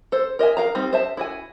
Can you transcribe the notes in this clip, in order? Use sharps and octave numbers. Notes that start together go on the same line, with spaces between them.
A4 C5
A#4 D#5 E5 G#5
A#4 F5 A#5
G3 C4 D#4
C5 E5 A5
E4 F#4 G#5